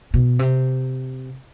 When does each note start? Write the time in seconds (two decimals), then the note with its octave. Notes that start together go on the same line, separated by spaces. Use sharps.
0.14 B2
0.39 C3